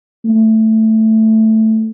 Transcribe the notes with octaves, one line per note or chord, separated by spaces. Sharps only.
A3